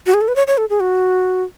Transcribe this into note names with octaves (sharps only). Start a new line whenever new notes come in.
F#4
G#4
A4
B4
C#5
C#5
A4
G#4
F#4